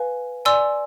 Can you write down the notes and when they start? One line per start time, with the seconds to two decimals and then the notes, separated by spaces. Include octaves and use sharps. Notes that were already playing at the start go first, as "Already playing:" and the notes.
Already playing: B4 F5 G#5
0.45 D5 G#5 C6 E6